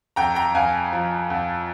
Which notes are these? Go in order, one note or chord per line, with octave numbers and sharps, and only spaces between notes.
F2 G5 A#5
G5 A#5
F2 F5 G#5
F3
F2